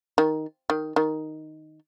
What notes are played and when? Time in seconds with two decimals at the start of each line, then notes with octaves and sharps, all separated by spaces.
0.18 D#3
0.70 D#3
0.96 D#3